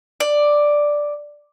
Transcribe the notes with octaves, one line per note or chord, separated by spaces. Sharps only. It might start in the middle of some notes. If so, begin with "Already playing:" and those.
D5